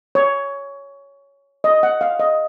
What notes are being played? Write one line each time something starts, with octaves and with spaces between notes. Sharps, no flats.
C#5
D#5
F#5
F5
D#5